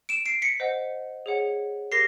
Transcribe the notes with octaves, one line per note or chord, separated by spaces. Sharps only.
D7 E7
C7 D7
B6 C#7
C5 D#5 F#5
G#4 C#5 F#5
G4 A#4 A#6 C7